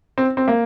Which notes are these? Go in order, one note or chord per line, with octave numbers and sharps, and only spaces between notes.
C4
C4
A#3